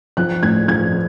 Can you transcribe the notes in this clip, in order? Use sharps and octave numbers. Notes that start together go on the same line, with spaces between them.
F3 F#6
A2 G#6
F3 G#6